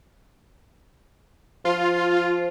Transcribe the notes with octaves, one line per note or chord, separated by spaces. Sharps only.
F3 F4